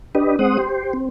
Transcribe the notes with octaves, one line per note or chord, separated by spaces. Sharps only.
D4 G4 B4 D#5
G#3 C4 C5 F#5 D#6
G4 C5
C4